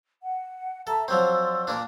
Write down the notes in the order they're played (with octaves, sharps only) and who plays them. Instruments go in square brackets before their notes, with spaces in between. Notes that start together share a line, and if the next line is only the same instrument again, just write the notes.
[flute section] F#5
[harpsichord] A4 [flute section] E5 A5 A#5
[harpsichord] F3 F#3 C4 [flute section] D5 C6 E6
[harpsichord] A#2 A#3 D4